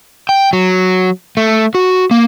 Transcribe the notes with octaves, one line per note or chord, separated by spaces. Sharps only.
G5
F#3
A3
F#4
A#3